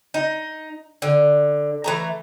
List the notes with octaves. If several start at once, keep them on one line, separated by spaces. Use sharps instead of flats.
D#4
D3
E3 A3 A#5